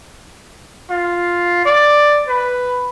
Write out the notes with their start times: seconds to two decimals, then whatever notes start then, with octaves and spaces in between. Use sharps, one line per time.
0.90 F4
1.66 D5
2.28 B4